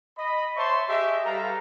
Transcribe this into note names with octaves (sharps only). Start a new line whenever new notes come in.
D#5 B5
C5 C#5 E5 A5 C6 C#6
G4 G#4 D#5 E5
G3 A4 B4 F5 A#5